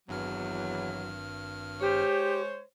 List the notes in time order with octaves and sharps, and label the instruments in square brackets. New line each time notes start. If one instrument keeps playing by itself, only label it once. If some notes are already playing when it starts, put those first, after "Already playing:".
[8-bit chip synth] G#1 G2 F6 [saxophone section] E2 E3 F#3
[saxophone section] G#3 C5 C#5 [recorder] G4